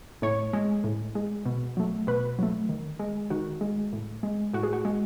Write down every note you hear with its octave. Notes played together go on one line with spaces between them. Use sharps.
A2 C#5
G#3
A2
G#3
B2
F#3 A3
B2 B4
F#3 A3
D#3
G#3
D#3 F#4
G#3
A2
G#3
A2 F#4
G#4
F#4
G#3